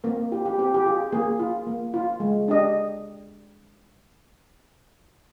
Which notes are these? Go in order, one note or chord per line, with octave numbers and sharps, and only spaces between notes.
A#3 C4 A#4
F4 G4
G4
C4 G4
G4
F4 G#4
A#3 G#4
F4
A#3
F4
G#3
D4 G4 D#5